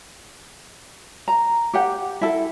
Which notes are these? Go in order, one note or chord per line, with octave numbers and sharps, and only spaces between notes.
A#5
G4 F#5 G5
E4 A4